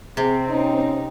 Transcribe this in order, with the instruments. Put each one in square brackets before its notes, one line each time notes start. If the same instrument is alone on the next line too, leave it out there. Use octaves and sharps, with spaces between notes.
[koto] C3 [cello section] C4 [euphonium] G#4
[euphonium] C#4 [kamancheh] D#4 G4